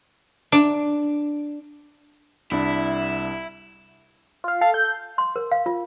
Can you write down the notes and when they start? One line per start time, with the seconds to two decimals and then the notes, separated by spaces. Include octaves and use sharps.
0.52 D4
2.51 C2 D4 E4 E5
4.44 F4 F5
4.61 A4 F5
4.74 G6
5.18 C6
5.36 A#4
5.52 F5
5.66 F4